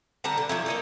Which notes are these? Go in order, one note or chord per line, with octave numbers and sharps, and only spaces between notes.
D3 G3 A5 A#5
D3
F3 F#3 E4
A#3 D#4 A4